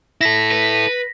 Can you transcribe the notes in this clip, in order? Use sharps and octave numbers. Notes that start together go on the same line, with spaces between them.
E4 A4 A#6 B6
B4